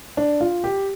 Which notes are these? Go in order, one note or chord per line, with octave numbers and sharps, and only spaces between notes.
D4
F4
G4